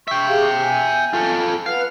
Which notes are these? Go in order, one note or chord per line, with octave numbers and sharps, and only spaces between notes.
E5 G5 C#6
G4 G#4 F5
G#5
F4 A4
B4 F5 F#5